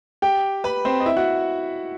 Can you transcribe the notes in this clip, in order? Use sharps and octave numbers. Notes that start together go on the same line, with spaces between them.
G4 G5
B4 B5
C4 C5
D#5
E4 E5
F#4 F#5